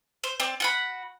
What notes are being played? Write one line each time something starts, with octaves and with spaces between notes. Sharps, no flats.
C5
C4 D5
F#4 F#5 B5